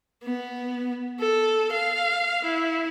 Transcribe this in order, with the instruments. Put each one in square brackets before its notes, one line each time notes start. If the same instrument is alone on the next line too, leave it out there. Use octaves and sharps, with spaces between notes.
[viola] B3
A4
F5
E4